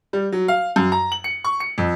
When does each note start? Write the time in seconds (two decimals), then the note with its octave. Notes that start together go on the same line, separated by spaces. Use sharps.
0.13 G3
0.32 F#3
0.48 F5
0.76 F#2
0.92 A#5
1.12 F#7
1.24 C#7
1.44 C#6
1.60 C#7
1.78 F2